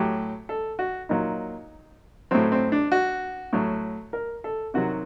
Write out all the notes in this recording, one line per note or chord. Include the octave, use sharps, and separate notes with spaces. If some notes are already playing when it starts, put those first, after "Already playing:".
Already playing: A2 F#3 G4
A4
F#4
A#2 F#3 D#4
A2 F#3 C4
C4
D4
F#4
A2 F#3
A#4
A4
C3 D#3 F#3 F#4